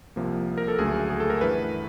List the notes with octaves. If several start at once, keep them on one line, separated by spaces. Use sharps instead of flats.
C2 C3 F3 A#3
A#4
A4
D2 C#3 F#3 A3 G#4
G#4
A4
A#4
G2 E3 A3 B4